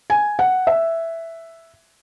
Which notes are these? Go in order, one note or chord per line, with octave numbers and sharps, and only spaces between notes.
G#5
F#5
E5